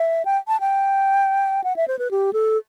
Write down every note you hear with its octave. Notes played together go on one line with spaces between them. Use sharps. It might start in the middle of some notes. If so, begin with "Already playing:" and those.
Already playing: E5
G5
A5
G5
F#5
E5
C5
B4
G4
A4